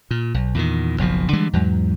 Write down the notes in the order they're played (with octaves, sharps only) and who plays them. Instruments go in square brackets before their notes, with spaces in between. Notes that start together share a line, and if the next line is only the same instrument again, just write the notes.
[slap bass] A#2
B1
E2 A#2 D3 D#3
F#1 B1 B2 F3
D3 E3 G3 G#3
E2 G#2 F#3